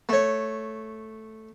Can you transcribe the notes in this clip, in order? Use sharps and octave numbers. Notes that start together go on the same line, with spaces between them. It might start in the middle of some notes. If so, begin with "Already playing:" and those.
A3 C#5